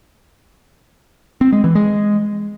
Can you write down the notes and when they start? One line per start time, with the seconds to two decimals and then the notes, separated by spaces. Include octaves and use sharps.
1.41 C4
1.53 G#3
1.64 E3
1.75 G#3